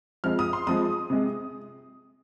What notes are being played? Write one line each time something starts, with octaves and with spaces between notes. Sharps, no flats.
F2 F3 G#3 F6
D#6
C6
F2 F3 G#3 D#6
C3 G#3